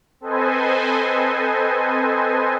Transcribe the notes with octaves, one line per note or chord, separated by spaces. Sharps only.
C4 A4 B4 C5 D#5 G#5